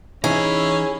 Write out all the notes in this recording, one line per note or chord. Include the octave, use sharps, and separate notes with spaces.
E3 C#4 D#4 E4 G#4